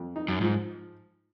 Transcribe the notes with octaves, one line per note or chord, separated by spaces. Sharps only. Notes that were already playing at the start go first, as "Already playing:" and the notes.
Already playing: F2
D#4
F#2
G#2 F3